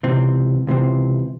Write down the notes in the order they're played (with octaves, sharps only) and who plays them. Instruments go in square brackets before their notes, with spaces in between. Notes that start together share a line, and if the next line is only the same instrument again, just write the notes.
[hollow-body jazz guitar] C#2 C3 E3 C4
C#2 C3 E3 C4